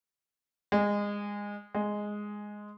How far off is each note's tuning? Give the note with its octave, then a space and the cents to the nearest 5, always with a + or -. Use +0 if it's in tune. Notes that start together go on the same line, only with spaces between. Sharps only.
G#3 -20
G#3 +0